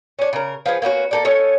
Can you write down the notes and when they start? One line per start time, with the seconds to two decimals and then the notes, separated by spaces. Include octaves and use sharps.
0.19 C#4 D4
0.33 C#3 A#4
0.66 F3 B3 G#4
0.82 A#3 B3 C#4 F#4
1.11 A#3 A4 D5
1.25 C#4 A4 C#5 D#5